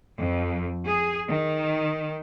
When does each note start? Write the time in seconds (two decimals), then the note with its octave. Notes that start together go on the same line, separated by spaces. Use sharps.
0.20 F2
0.87 G#4
1.29 D#3